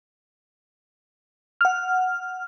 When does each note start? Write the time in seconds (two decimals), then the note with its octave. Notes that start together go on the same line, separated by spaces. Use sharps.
1.61 F#5 F6